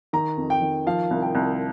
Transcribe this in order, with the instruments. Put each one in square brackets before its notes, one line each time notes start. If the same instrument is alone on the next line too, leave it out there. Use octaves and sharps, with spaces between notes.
[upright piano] D#3 [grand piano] A#5
[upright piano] F2
[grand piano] G5
[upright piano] D#3
[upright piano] F3 [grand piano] F5
[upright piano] C2
[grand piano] G5
[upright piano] C2